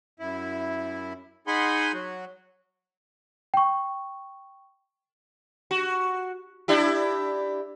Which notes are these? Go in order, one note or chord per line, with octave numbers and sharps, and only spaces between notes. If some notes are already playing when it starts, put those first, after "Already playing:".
F#2 E4
D#4 G#4 F#5 G#5 B5 C6
F#3 F#4
G5 C#6
F#4
D4 E4 G4